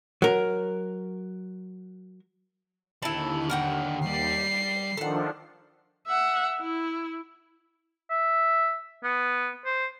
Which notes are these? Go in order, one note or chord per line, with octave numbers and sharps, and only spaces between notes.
F#3 A#4
D#2 D3 E4 A5 B5
A#4 F#5 G5
G3 C7
D#3 F3 D4 A4 F#5
E5 F#5
E4
E5
B3
C5